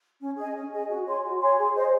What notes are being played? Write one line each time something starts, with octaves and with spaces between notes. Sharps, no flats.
C#4
G#4 D#5 G#5
C#4
G#4 D#5 G#5
F#4
C#5 G#5 C6
F#4
C#5 G#5 C6
G#4
C5 D#5